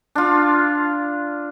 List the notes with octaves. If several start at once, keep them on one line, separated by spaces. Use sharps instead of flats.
D4 F4